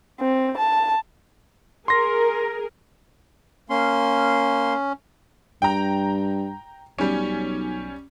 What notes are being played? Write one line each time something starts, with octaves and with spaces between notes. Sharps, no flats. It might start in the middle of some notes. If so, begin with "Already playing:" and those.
C4
A5
G#4 A#4 C6 A#6
A#3 C#4 C6
G2 G5 A#5
B1 G3 C#4